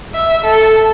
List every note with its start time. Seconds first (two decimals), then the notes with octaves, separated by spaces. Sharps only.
0.14 E5
0.44 A4